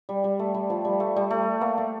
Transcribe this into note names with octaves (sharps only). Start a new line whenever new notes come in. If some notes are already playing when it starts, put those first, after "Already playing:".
G3
G3
A3
G3
F3
G3
A3
G3
A3
A#3
A3